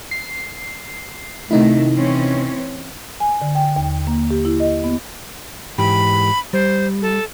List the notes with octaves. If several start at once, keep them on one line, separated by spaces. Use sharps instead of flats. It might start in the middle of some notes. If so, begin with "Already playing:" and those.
C7
C3 D#3 A3 D#4 E4
E3 C4 C#4
G#5
D3
G5
D#2
A#3
G4
E4
D#5
B3
G#2 E3 G4 B5
G3 C5
A4